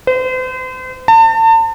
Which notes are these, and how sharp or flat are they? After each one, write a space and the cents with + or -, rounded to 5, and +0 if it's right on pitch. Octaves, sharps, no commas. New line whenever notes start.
C5 -40
A5 +40